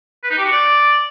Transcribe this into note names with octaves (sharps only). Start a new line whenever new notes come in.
B4
D#4
G4
F#4
D5